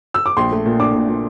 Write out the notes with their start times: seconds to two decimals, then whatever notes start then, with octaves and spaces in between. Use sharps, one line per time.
0.14 E6
0.26 D6
0.37 A#1 C6
0.51 A3
0.66 A#2
0.80 D4 D6
0.95 A#2
1.08 A#2